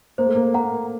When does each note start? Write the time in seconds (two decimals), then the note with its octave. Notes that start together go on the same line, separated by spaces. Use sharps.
0.18 A#3 C5
0.26 A3
0.35 A#3
0.54 A#3 F#5 A#5